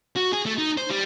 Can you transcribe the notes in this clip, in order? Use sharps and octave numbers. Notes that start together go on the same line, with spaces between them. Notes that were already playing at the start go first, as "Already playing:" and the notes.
F#4
G#4
A3
D#4
C5
G3